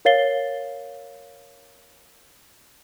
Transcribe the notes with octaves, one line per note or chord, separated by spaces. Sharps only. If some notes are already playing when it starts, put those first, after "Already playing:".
A#4 C#5 F5 A6 C7 G7